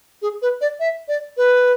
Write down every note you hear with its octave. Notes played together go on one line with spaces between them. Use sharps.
G#4
B4
D5
E5
D5
B4